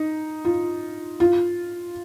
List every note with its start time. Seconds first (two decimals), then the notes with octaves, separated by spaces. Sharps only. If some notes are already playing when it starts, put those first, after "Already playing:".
Already playing: D#4
0.45 F4
1.20 F4